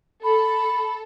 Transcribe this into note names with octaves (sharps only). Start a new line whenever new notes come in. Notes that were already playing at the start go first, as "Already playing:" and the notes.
A4 B5